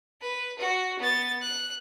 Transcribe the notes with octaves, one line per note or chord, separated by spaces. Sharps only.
B4
F#4
B3 A6
F#6